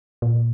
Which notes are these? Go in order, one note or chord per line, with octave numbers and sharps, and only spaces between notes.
A#2